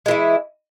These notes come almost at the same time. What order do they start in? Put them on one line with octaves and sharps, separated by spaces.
G#3 E3 E4